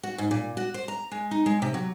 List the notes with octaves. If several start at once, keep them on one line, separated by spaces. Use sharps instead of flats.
F#4
G#2
A#2
F#4
C5
A#5
G#3
D#4
G#3
C3
F#3